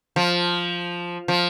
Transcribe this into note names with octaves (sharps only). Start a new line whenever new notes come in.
F3
F3